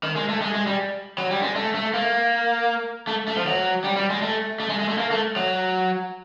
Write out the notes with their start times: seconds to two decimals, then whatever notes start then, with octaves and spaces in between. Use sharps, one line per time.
0.03 D#3
0.16 G#3
0.29 A3
0.41 G#3
0.54 G#3
0.67 G3
1.18 F#3
1.31 G3
1.42 G#3
1.56 A3
1.74 A3
1.94 A#3
3.07 A3
3.28 A3
3.36 F3
3.47 F#3
3.84 G3
3.96 G3
4.10 G#3
4.22 A3
4.60 A3
4.69 G#3
4.79 G#3
4.89 A3
4.98 A#3
5.11 A3
5.36 F#3